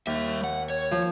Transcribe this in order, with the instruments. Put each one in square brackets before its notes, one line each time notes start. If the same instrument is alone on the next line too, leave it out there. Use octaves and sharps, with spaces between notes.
[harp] D#2 [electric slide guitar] G3 E5
[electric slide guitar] F#5
C#5
[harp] F3